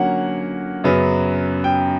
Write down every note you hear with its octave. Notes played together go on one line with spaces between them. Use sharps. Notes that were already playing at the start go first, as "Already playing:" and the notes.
Already playing: D3 F#3 A#3 C#4 F#5
F#2 C#3 F#3 B3
G5